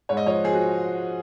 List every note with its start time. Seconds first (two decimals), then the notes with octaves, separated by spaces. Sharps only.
0.09 G#2 C#5
0.17 D#5
0.26 F3 C#5
0.44 F3 G#4
0.53 F#4